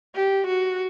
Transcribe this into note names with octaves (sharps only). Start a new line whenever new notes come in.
G4
F#4